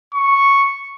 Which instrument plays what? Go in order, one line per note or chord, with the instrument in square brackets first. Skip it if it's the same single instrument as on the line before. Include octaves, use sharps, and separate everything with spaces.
[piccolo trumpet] C#6